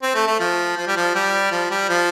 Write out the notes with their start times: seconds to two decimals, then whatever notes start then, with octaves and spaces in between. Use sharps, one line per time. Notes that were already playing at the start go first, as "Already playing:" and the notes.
0.03 C4
0.15 A3
0.27 A3
0.40 F3
0.77 F3
0.87 G3
0.97 F3
1.15 G3
1.52 F3
1.71 G3
1.89 F3